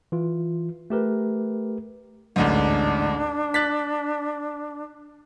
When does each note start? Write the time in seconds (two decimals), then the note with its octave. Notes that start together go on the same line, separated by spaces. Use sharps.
0.12 E3 F4
0.90 A3 G4 A#4 B4
2.36 A1 D2 G#2 D4
3.54 F#6 A6 B6